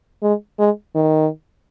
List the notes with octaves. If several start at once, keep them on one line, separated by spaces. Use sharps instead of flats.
G#3
G#3
D#3